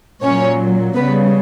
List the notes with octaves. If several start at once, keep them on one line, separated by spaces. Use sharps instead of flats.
A#2 F#3 C#4 C#5
C#3 G3 B3 B4